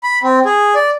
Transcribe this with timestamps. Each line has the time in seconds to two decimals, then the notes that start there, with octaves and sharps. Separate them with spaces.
0.03 B5
0.23 C4
0.45 G#4
0.75 D5